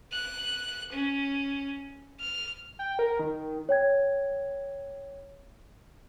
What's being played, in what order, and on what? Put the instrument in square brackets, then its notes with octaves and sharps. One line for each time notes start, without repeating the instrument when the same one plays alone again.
[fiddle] F#6
C#4
F6
[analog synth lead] G5
A#4
D#3
[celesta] C#5 G5 G#6